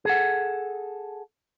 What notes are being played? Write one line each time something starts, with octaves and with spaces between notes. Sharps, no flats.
G#4 A4 F#5